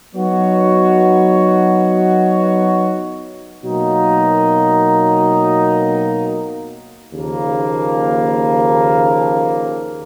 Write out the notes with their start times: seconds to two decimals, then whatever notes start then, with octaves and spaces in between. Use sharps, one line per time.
0.15 F#3 B3 D#4 F#4 C#5
3.63 B2 F#3 A#3 D#4
7.13 D#2 C#3 F3 A#3